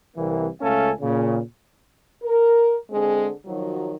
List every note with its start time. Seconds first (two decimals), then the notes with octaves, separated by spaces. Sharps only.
0.16 C2 E3 A#3
0.61 C#2 A3 C#4 A4 F5 G#5
1.01 A#2 C#3
2.23 A#4
2.91 D3 G#3 C4 G#4
3.45 D#3 F3 F#3